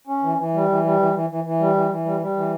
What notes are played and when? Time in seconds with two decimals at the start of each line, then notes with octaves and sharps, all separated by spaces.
0.07 C#4
0.23 E3
0.38 E3
0.54 G3
0.69 E3
0.84 G3
0.99 E3
1.14 E3
1.30 E3
1.44 E3
1.60 G3
1.75 E3
1.91 E3
2.05 G3
2.21 G3
2.36 E3